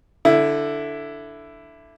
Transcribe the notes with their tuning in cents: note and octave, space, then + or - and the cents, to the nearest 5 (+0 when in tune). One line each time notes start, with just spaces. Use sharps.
D3 +0 E4 +10